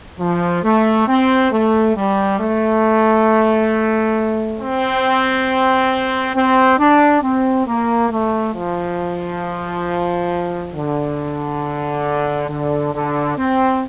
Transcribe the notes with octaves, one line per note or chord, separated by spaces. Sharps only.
F3
A3
C4
A3
G3
A3
C4
C4
D4
C4
A#3
A3
F3
D3
D3
D3
C4